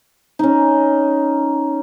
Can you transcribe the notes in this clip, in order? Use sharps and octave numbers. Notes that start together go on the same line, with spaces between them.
C#4 D#4